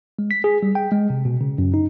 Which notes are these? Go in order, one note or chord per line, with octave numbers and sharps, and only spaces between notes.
G#3
B6
G#4
G3
G5
G#3
C3
B2
C#3
F#2
D#4